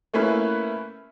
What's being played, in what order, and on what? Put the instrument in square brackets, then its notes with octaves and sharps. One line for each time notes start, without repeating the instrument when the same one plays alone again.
[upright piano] A3 A#3 C#4 E4 B4